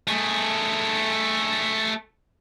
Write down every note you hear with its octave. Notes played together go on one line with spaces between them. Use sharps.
A3 G#4